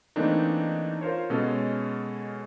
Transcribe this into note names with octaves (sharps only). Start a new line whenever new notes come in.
E3 A3 A#3 C4 D4 D#4
F4 A#4 C5 C#5
B2 G#3 C#4 A4